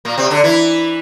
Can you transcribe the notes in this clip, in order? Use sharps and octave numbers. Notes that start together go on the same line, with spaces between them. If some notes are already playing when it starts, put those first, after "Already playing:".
A#2 A#3
C3 C4
D3 D4
E3 E4